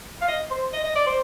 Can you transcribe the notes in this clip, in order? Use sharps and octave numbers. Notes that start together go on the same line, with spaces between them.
F5
D#5
C5
D#5
D#5
D5
C5